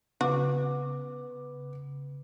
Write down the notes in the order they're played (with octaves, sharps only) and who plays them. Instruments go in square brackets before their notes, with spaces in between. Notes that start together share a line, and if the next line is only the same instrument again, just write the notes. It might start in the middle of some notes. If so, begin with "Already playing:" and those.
[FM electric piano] C#3 [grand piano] B3 D6 [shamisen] F#4